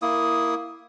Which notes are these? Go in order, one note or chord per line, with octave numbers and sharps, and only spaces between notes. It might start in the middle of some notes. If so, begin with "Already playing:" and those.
A#3 E4 D#6